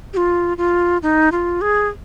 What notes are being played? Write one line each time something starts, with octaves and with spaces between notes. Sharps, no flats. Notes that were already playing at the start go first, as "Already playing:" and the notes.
G4
F4
F4
D#4
F4
G#4